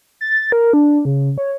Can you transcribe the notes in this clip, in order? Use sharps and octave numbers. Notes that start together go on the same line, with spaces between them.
A6
A#4
D4
C#3
C#5